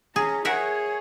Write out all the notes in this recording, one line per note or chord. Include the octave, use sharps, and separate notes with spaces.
C#4 G#4 A#5
G#4 A#4 C#5 E5 F#5